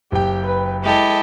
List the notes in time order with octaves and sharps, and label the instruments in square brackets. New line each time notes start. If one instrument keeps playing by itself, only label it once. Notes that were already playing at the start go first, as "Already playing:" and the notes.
[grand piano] F#1 G5 [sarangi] G4
[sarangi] B4
[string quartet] G#3 G4 A4 [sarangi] E4